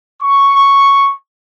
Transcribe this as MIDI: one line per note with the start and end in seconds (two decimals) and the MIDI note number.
0.22 1.13 85